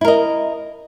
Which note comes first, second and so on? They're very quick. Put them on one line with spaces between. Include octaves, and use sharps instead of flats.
E4 A#4 D#5